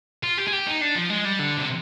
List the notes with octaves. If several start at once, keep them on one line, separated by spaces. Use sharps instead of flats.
F4
G4
G#4
G4
D#4
D4
F3
G#3
G3
D3
C3